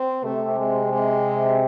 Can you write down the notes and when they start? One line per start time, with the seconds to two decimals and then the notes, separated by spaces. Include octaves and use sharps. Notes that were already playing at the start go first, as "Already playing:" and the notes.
Already playing: C4
0.24 C3 A3
0.57 G#3
0.92 G#3